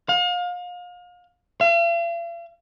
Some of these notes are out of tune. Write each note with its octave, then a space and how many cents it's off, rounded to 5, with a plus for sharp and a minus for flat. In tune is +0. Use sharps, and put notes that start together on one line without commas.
F5 +35
F5 -45